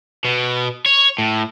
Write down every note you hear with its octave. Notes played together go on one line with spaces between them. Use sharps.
B2
C#5
A2